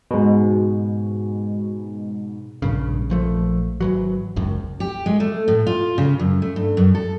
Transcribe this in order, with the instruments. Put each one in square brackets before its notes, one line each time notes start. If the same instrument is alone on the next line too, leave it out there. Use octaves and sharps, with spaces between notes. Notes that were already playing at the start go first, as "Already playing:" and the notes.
[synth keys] G#2 B2
[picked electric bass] A#1 G2 C#3
A#1 F3 A3
G#1 E3 F#3
F#1 C#2 F#2
[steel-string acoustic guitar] G4
G#3
A3
A2
F4
C#3
F#2
A3
G2
F#2
A4